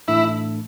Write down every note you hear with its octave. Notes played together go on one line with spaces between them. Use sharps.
A2 E3 A3 D4 E4